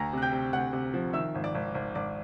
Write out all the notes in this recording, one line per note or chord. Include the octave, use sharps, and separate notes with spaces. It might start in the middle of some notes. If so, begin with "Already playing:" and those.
Already playing: D2 A#5 A#6
C3 F#6
G5 G6
C3
D2 F#5 F#6
C3
F3
D#3 E5 E6
G#1
D5 D6
G#1
G#1
G#1 D5 D6